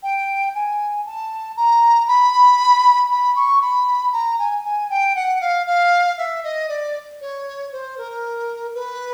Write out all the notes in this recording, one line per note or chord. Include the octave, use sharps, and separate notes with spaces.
G5
G#5
A5
A#5
B5
B5
C#6
B5
A#5
G#5
G#5
G5
F#5
F5
F5
E5
D#5
D5
C#5
C5
A#4
B4